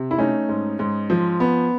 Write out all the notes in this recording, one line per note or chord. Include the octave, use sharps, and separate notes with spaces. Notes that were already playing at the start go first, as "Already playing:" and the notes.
Already playing: C3
E4
A3 C#4 D#4
G#2
G#2
F3
B3